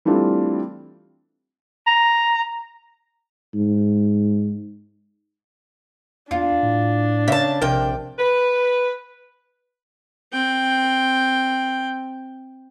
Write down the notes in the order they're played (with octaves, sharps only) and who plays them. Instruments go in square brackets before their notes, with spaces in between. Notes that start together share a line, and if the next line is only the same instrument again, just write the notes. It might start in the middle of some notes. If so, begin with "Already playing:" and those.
[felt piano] E3 G3 A3 C4 D4 F4
[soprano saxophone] A#5
[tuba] G#2
[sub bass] E2 [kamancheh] D4 [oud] F4
[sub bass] A2
[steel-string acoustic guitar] C#3 A5 [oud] E5
[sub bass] A#1 [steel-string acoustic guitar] C3 G5 [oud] A#4
[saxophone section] B4
[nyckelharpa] C4 G5